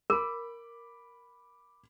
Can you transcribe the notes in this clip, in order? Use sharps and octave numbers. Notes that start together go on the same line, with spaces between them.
A#4 B5 D6